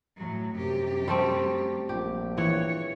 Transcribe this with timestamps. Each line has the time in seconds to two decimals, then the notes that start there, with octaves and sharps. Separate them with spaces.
0.17 A2 F#3
0.56 F#2 C3 G4
1.08 G3 A3 C4
1.89 A#1 G4
2.38 E3 C#5